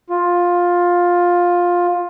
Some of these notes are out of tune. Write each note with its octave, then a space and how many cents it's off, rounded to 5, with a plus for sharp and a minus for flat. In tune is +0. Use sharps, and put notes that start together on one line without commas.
F4 +15